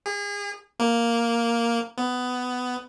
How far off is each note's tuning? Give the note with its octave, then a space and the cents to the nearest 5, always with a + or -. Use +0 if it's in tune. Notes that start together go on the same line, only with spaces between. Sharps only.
G#4 -35
A#3 +0
B3 +15